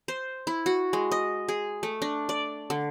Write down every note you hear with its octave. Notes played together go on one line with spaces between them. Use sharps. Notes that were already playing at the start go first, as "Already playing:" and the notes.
C5
E4
F#4
G#3
D#5
G#4
A3
D4
D5
D3